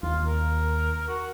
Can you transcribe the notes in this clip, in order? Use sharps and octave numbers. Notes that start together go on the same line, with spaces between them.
D#2 F4
A#4
F#4